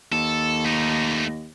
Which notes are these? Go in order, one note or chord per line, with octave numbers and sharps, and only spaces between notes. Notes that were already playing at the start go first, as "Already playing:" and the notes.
D#2 A4
A3 D#4